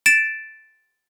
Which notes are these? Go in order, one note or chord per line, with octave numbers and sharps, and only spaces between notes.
A6 D7 E7